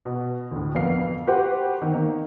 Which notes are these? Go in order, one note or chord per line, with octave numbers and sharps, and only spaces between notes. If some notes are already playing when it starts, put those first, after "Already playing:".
B2
D2 A2
F2 A#3 B3 F5 C7
F#4 G4 B4 C5 F#5 G5
D#3
D#3 A#3